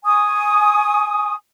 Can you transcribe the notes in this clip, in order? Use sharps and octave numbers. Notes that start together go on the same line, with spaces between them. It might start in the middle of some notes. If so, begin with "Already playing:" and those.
G#5 C#6 D#6